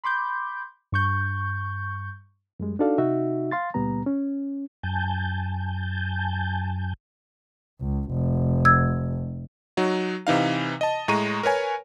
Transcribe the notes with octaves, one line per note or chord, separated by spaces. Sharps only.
B5 C6 D6 G6
G2 C#6 G6
F#2 G3 G#3
D4 D#4 F#4 A4 D5 F5
C3 D#4 F#4 E5
F5 C6 A6
C#2 A#2 G3 B3 A#5
C#4
F#2 G#5 A5 G6
C#2
F1
E6 G#6
F#3 D#4 F#4
C3 E3 D#4 F5
D#5 A5
A2 G#3 A#5 C#6 D#7
A#4 B4 C#5 G#5